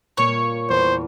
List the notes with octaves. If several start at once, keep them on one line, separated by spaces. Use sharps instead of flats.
A#2 A#3 C#5
E2 C5